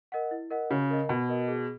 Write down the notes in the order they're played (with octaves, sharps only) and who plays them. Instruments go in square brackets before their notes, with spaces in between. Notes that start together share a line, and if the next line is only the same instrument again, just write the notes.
[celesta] A#4 D#5 F#5
E4
A#4 D#5 F#5
[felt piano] C#3 [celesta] F#4
[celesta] A#4 D#5
[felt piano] B2 [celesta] F#4
[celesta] A#4 D#5
G#4